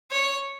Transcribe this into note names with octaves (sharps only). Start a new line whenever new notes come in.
C#5